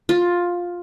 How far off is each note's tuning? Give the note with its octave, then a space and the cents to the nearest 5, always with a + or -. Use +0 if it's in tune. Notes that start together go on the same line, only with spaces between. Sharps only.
F4 +10